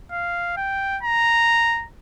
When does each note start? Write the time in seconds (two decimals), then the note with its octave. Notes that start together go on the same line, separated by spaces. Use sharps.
0.12 F5
0.57 G5
1.03 A#5